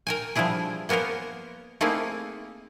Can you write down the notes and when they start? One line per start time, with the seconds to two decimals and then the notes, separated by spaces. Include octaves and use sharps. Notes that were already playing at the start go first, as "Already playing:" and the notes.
0.07 A#4 G5 G#5
0.35 F3 G3 D4 E4 G#4
0.89 A#3 B3 C#4 A#4 C5
1.81 A3 A#3 C4 D#4 E4 G#4